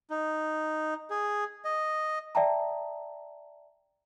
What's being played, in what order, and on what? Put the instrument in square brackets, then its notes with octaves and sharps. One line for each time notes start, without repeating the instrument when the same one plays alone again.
[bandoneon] D#4
G#4
D#5
[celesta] D5 E5 G5 A5 A#5